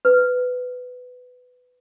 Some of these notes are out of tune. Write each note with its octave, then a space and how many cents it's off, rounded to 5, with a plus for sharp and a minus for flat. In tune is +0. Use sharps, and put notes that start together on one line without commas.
B4 +15